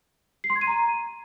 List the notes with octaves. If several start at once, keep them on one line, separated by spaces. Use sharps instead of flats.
C7
C6
G#6
D#7
A#5